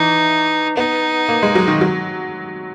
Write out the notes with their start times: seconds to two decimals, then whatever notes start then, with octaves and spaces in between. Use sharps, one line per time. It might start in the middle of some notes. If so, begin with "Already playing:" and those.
Already playing: E3 D#4
0.77 B3 D#4
1.28 A#3
1.43 G#3
1.55 F#3
1.67 D#3
1.81 F#3